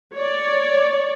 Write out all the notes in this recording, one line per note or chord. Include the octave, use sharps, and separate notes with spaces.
C#5 D5